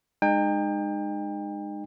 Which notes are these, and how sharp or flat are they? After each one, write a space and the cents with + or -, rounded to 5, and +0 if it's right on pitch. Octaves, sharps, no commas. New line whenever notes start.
G#3 -5 D#4 -30 G5 +30